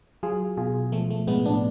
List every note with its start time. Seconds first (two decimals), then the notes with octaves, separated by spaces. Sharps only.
0.23 F#3 F4 G#4
0.57 B2 F4 G#4
0.92 F3 A3
1.10 A3
1.27 A2 G#3 B3
1.46 B3 D4